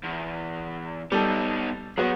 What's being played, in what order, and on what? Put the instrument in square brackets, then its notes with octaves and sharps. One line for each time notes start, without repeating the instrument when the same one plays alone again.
[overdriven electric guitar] E2
[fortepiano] G3 A4 [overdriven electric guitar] B3 D#4
[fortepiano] F#3 B3 [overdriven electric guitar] G#4 F#5